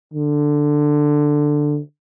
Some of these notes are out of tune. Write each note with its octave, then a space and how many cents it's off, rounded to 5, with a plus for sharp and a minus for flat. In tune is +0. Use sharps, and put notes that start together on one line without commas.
D3 +10